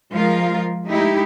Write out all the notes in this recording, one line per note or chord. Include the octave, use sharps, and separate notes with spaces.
F3 G#3 F4 A#4 F5
G#3 A3 D#4 E4 G4